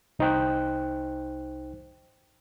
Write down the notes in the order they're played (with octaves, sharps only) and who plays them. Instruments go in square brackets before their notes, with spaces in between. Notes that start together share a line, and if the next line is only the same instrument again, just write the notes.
[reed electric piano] C2 D#4 C5 G5 F#6